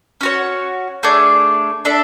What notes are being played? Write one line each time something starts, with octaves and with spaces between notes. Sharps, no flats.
C#4 F#4 C#5
A3 D4 G#4 D5
D4 A4 E5